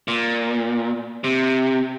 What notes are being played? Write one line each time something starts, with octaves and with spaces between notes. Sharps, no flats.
A#2
C3